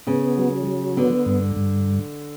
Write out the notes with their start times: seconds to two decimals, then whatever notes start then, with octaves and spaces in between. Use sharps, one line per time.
0.07 C#3 B3
0.38 F#3
0.67 F#3
0.97 D3 B3
1.26 G2
1.56 G2